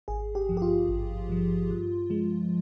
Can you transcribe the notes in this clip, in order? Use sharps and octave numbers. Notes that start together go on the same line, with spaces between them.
G#1 G#4
G4
G2 F3
G4
F4
G#1
G2 F3
G2
F3 G#3